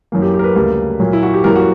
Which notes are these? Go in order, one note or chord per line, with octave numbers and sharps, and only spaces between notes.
F#2 E3 A#3
G4
G4
A#4
B4
D2 C#3 G3 A#3
A#2 F#3 A#3
E4
F#4
G4
F#2 E3 G3 A#3 A#4
F#4